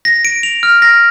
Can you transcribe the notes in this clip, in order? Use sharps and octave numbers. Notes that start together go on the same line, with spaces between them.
A#6
D7
F7
F6
A#6